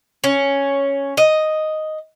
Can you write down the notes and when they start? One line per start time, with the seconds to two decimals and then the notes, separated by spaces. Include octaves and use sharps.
0.24 C#4
1.17 D#5